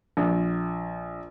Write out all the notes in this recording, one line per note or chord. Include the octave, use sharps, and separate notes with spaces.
A#1